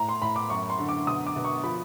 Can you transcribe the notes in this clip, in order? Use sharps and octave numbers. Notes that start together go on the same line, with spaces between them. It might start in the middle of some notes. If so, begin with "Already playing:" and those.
Already playing: A2 A#5
C6
A2 B5
D6
F#2 C#6
C6
D3
D6
B2 D#6
D6
B2
C#6
F3 B5